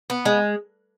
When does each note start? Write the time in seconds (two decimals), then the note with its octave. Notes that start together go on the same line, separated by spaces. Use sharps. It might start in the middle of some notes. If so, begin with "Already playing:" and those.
0.10 B3
0.25 G#3